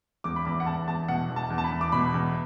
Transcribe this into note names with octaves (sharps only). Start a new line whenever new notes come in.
E2 D6
B5
E2 D6
F#5
E2 A5
E2 A5
B2 F#5
E2
A5
E2
A5
B5
E2
D6
B2 B5
E2